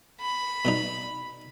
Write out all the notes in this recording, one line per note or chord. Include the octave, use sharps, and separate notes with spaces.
B5
B2 G3 D#4